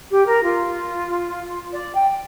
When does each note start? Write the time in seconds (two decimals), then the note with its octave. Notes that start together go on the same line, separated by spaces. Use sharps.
0.10 G4
0.26 A#4
0.42 F4
1.73 D5
1.95 G5